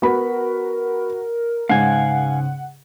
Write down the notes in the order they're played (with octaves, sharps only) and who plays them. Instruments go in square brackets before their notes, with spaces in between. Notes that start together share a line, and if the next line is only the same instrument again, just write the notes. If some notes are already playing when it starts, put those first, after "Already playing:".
[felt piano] B3 B5 [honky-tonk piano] F#4 [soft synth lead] A#4
[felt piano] G#2 [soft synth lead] C#3 [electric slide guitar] F5 G#5 [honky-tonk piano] F#5